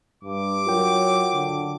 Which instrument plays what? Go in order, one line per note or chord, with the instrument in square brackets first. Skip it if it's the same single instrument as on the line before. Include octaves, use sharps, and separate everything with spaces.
[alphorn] G2 [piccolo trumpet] D6
[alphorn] F#3 [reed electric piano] F4 A#4 G5
[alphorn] D3